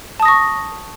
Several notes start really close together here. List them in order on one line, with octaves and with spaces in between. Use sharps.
A5 D#6 A#6 C#6